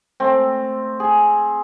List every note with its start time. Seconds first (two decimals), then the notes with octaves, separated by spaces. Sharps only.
0.20 A3 C4
1.00 G#4